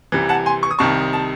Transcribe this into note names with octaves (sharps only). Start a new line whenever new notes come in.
C2 C3 E3
F#5 A5
G#5 C6
C#6
D#6
C2 C3 D#3 A5 C#6
A5